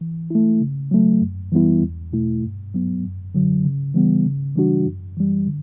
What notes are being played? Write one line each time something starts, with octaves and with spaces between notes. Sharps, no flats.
E3
A3 E4
C#3
F#3 A3
F#2
E3 G3 B3 E4
E2
B2 A3 E4
G2
F#3 B3
F#2
D3 F#3
C#3
E3 G3 B3
C#3
E3 G3 D4 F#4
F#2
E3 G3
D3